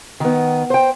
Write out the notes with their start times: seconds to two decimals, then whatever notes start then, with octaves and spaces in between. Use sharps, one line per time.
0.20 D#3 B3
0.70 C5 G5